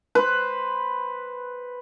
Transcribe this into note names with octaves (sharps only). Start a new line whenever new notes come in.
B4 C5